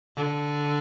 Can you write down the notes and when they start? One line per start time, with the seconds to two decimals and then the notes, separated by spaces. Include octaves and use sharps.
0.17 D3